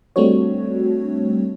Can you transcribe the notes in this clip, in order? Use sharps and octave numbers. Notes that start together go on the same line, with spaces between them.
G3 A3 C4 D4 F#4 C#5